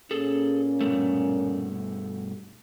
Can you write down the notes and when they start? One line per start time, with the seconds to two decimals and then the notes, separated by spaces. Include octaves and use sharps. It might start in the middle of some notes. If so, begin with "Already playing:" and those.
0.11 A#2 A#3 C#4 G#4 A4
0.81 G2 B2 A3